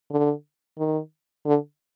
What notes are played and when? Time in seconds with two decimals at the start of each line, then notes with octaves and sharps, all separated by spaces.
0.11 D3
0.78 D#3
1.46 D3